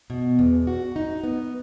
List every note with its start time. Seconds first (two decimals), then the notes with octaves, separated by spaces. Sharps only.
0.10 B2
0.39 E2
0.67 F#4
0.96 D#4
1.24 B3